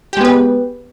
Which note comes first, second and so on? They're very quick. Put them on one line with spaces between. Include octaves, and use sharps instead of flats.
G4 G#3 B3 B4